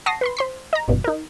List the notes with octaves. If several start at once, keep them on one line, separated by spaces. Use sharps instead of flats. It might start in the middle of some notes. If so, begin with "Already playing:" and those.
F#5 A5 C#6 D#6 A#6 C7
B4 B5 C6
C5 C6 B6
D#5 A#5
G1 E2 G2 B2
D#4 A#4